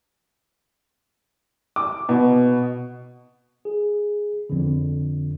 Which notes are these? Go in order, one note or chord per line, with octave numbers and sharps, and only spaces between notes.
D6
B2
G#4
F2 D3